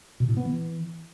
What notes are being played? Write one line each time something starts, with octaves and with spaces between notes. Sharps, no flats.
B2
A2
B3
E3